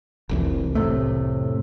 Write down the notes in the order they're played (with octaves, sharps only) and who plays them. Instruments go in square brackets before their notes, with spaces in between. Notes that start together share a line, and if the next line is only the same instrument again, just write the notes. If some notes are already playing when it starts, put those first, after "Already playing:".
[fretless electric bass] F1 C2 E3
[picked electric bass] A2 C3 A3